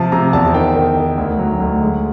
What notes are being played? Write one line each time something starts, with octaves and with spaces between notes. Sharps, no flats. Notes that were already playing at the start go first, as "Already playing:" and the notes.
Already playing: C3 F3 A5
C3 A#5
E2 A5
D#3 G5
D#3
D#3
D2
F#3
D2
G#3